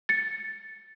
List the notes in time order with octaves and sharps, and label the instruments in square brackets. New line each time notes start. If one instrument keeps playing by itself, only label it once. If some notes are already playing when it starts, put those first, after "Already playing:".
[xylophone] A6 C#7